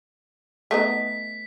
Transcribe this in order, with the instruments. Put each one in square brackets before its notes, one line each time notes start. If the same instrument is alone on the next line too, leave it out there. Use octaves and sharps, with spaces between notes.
[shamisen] A3 B3 D#4 [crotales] B6